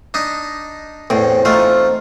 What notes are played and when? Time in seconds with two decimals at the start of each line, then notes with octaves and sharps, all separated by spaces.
0.14 D4 D#4
1.10 E2 A2 C4
1.45 E2 A3 C4 D#4 F4